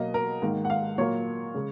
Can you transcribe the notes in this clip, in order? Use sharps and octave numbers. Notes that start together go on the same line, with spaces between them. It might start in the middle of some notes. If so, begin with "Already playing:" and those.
Already playing: B2 F#3 A#3 D#5
A#4
G#2 D#3 A#3
F#5
F5
A#2 F#3 A#3 C#5
C#3 G#3